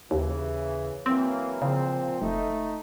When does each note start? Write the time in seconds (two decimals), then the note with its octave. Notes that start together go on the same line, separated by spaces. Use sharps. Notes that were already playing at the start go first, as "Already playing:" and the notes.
0.11 D#2 C#3 E3
1.06 E3 F#3 A#3 C4
1.62 A#2 C#3 F3 C4
2.22 F1 A3 D#4